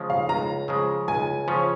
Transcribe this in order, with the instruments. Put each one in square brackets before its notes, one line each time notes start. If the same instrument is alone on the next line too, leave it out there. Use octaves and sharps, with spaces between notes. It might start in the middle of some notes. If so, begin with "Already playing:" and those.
Already playing: [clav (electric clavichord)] C#3 F3 G#3
[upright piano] F5
[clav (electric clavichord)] C#2 [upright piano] A#5
[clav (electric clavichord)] C#3 F3 G#3
[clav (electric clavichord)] C#2 [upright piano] G#5
[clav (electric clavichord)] C#3 F3 C#4